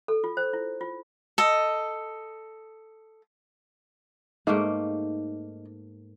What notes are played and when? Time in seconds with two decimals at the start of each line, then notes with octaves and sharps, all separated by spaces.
0.08 A4
0.24 F4
0.37 C5
0.53 E4
0.81 F4
1.38 A4 D#5
4.47 G#2 A3 A#3 D#4